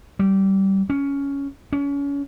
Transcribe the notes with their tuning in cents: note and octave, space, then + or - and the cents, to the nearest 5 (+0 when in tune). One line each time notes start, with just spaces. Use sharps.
G3 -20
C#4 +10
C#4 +30